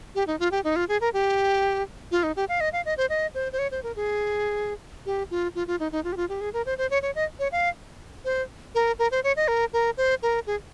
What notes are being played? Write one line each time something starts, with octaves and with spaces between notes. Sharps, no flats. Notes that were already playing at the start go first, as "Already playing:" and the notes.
G4
D#4
F4
G4
D#4
F4
G#4
A#4
G4
F4
D#4
G4
F5
D#5
F5
D#5
C5
D#5
C5
C5
C#5
C5
A#4
G#4
G4
F4
F4
F4
D#4
D#4
F4
G4
F4
G4
G#4
A#4
C5
C5
C#5
C#5
D#5
C#5
F5
C5
A#4
A#4
C5
C#5
D#5
A#4
A#4
C5
A#4
G#4